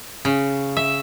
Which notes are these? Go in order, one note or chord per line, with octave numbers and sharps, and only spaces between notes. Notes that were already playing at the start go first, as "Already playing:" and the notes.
C#3
E5